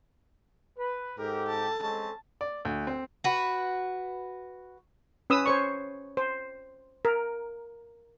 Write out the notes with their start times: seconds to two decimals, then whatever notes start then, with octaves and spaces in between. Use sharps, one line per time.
0.78 B4
1.19 G#2 G4 A4 A#4
1.48 A5
1.83 G#3 C4 C#4 A5
2.41 D5
2.65 D2
2.87 C4
3.24 F#4 B4
5.30 C#4 B4 D#6 E6
5.46 C5 C#5 C#6
6.17 C5
7.05 A#4